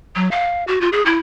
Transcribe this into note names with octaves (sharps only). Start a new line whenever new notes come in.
F#3
F5
F#4
F4
G#4
E4